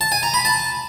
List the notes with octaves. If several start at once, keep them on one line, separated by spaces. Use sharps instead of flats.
A5
G#5
A#5
B5
A5